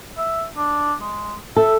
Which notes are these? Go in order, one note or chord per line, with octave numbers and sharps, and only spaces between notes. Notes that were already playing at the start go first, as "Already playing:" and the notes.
E5
D4
G#3
A4 E5